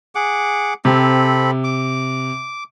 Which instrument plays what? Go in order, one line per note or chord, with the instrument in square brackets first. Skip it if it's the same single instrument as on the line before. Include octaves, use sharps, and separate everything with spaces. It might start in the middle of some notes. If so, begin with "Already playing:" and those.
[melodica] G#4 F#5 D6
[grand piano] C3 [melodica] C4 A4 B5
[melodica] D6